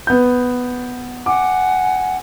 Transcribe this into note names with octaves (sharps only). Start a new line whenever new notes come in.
B3 G6
F#5 G#5 D6